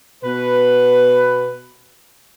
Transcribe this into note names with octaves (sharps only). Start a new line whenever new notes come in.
B2 B3 B4